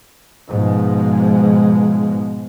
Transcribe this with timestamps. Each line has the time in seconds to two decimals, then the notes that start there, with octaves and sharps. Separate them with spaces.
0.49 G#2 B2 F3 G#3